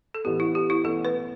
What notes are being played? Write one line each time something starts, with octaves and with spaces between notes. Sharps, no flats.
A4
A1 A2 E3 B3 G4
E4
G4
E4
A1 A2 E3 B3 A4
B4